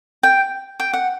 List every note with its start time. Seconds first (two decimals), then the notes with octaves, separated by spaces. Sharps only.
0.23 G5
0.80 G5
0.93 F#5